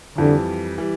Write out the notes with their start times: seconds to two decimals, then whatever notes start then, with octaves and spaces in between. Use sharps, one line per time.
0.18 F2 D3 E3 G3
0.78 E3 G3